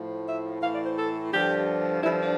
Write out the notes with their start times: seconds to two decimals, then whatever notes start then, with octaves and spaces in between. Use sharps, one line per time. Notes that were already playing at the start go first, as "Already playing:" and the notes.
Already playing: A2 F3
0.26 E5
0.61 A2 E3 F5
0.73 D5
0.85 C5
0.96 A4
1.31 G2 D3 F3 G4
2.02 G2 D3 F3 E4
2.19 D4